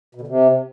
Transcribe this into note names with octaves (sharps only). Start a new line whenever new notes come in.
B2
D3
C3